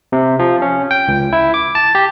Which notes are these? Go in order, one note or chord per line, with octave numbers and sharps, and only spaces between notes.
C3
F3
C#4
G5
C#2
E4
D6
A5
G4